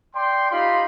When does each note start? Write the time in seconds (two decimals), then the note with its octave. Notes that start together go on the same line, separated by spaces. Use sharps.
0.15 D5 G5 C6
0.51 D#4 F4 G4 B5 C6